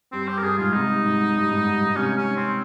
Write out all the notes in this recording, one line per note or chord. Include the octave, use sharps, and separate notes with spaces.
G2 C4
G4
A#4
G2 G#4
G#2 F4
C3 D#4
G#2
G2
G#2
G2
G#2
C3 C#4
C#4
C4